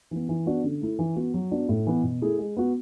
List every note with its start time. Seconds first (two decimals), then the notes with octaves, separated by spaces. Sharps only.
0.11 E3 B3
0.29 E3
0.46 B3 D4 F#4
0.64 D3
0.81 A3 E4
0.99 E3
1.16 B3 F#4
1.34 F#3
1.51 B3 D4 F#4
1.69 A2
1.87 E3 B3
2.04 B2
2.22 A3 E4 G#4
2.39 G#3
2.57 B3 F#4